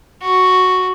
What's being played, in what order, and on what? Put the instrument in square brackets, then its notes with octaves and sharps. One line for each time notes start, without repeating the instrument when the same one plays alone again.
[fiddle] F#4